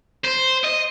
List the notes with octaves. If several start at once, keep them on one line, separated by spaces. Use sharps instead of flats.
C5
D#5